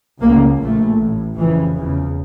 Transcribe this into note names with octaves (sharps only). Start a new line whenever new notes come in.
C#2 C#3 A#3
A#1 A#2 A3
A1 A2
F1 F2 C#3 E3
F1 E2 C#3